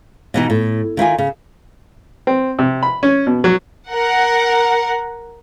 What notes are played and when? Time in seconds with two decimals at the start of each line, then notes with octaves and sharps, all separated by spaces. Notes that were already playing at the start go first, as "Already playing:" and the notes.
0.34 B2 E3 D#4
0.50 A2
0.97 D#3 E4 F4 G#5
1.18 C#3
2.27 C4
2.59 C3
2.83 B5
3.03 C#4
3.27 B2
3.44 F#3
3.91 A#4 F#5